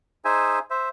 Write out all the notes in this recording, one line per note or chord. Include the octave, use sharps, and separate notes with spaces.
D#4 G#4 C5 E5 G#5
C5 E5